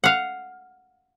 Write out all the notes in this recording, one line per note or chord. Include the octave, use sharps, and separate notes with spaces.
F5 F#5